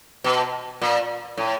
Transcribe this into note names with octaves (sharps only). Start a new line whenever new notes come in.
B2
A#2
A2